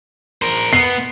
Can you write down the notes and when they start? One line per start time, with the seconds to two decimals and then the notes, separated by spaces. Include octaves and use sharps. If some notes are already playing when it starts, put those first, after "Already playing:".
0.42 A#4 C5
0.73 B3 C7